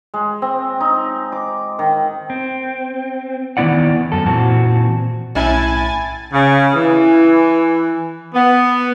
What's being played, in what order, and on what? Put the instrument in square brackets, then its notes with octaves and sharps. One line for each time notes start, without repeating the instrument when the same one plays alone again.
[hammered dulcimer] G#3
C4
D#4
D6
D#3
[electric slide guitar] C4
D#3 E3 B3 E4 D5 F#5
F#2 A4
A#2 E3 C4 F#4 A5
[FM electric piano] B1 A5 [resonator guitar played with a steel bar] A2 C#4 E4 [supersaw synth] G#5 G#6 A6
[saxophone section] C#3
E3
B3